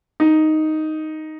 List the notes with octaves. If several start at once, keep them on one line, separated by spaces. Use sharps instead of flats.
D#4